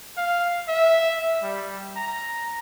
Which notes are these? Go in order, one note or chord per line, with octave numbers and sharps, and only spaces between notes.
F5
E5
G3
A#5